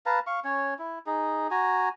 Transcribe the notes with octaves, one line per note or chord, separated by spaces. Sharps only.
B4 F5 A5 A#5
F5 C#6
C#4 C#5
E4
D#4 G#4
F#4 G#5 A#5